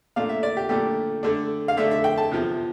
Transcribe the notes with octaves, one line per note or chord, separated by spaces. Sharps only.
A#2 A3 D4 F5
E5
D5
G4
A#2 A3 D4 G4
D3 A3 D4
F5
D3 A3 D4 E5
E5
G5
A5
E2 C3 F3